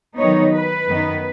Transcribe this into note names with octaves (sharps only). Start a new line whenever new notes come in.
D#3 F#3 B3 D#4 C#5
B4
F#2 D#3 B3 D#4